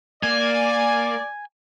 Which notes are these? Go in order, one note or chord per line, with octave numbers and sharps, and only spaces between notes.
A#3 D5 G#5